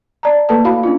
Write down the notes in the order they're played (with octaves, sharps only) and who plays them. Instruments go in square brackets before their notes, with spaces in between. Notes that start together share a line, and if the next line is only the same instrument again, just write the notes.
[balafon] D5 A5 A#5
A3 A#3 A4 B4 A5
E4 F#4 F5 B5
C#4 D4 F4